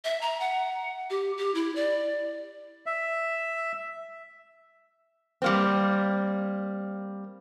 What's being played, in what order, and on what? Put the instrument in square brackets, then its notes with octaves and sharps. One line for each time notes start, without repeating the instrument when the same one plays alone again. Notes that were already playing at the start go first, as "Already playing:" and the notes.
[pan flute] E5
A#5
F#5
G4
G4
E4
D5
[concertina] E5
[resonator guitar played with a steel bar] G3 A#3 C4